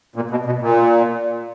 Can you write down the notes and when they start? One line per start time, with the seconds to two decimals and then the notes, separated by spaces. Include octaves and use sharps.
0.16 A#2
0.31 B2
0.46 B2
0.61 A#2